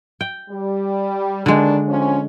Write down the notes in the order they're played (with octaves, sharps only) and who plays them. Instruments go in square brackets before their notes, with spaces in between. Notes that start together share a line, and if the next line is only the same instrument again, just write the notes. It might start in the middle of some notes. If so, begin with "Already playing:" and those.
[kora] G5
[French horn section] G3
[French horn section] D#2 D#3 D4 [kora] D3 G#3
[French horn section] F3 C4 C#4